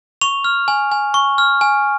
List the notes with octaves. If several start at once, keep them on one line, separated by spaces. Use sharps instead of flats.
C#6 F7
F6
G#5
G#5
C#6
F6
G#5